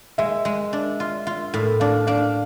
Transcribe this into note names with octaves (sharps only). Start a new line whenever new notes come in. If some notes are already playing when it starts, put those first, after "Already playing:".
G#3 E5
G#3
D4
F4
F4
A2
D4 F5
D4 F5